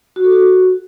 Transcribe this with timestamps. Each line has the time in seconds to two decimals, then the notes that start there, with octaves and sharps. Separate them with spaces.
0.16 F#4
0.24 A4
0.32 F#4